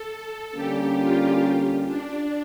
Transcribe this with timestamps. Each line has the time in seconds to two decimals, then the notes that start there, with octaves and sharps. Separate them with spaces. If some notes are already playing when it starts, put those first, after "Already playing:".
Already playing: A4
0.11 A4
0.55 D3 G3 A#3 C#4 G4
0.99 F4
1.86 D4